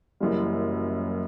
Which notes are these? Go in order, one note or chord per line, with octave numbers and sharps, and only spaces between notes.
F#1 F#2 E3 G3